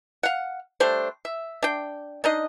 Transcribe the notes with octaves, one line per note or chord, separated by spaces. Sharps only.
F5 F#5
G3 A3 D4 C5
E5
D4 G5
D4 D#4 D#5